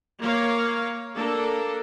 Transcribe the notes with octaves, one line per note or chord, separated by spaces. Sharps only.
A#3 C#5 F5
A#3 D4 A4